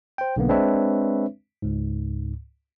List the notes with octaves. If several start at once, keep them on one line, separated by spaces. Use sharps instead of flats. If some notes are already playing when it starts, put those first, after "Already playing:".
C5 G5
B1 D3 A#3 B3
G#3 C4 D4 B4 C#5 E5
C#2 G#2